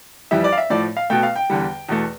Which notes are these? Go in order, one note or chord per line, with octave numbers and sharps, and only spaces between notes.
F2 E3 G3 E5
D5
F5
E5
A2 F3 A3 D5
F5
B2 A3 G5
F5
G5
E2 D3 G3
E2 B2 A3